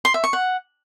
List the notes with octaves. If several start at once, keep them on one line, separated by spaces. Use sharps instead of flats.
C6
E5
C#6
F#5